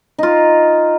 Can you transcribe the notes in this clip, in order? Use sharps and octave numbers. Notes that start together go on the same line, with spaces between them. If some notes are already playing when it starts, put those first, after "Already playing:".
D#4 F4